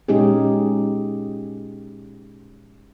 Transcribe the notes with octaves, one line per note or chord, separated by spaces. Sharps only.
A#2 G#3 C#4 D#4 G4 G#4